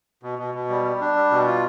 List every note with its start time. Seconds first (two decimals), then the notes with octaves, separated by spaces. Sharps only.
0.23 B2
0.39 B2
0.54 B2
0.69 G3
0.85 G3
1.01 D4
1.16 G3
1.31 B2
1.47 F4